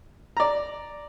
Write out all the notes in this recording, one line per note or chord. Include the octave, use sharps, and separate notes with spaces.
D5 A#5